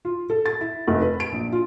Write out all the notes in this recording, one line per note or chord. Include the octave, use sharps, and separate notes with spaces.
F4
A4
A6
E4
F1
B4
D7
A#1
F4